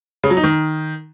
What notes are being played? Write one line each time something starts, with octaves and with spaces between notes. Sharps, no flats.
C#3
F#3
D#4
D#3